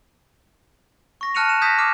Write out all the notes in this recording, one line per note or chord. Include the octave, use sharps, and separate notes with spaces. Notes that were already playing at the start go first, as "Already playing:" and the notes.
C#6 A#6
A5 F6 F#6 C#7 D#7 F7
E7
D#6 G6 G#6 A#6 B6
D6 F6 C7